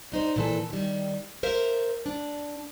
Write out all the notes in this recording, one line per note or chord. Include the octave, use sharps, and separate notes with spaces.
D4 D#4 C5
A#2 E3 A4
D#3 G3
A#4 C5 E5 F5
D4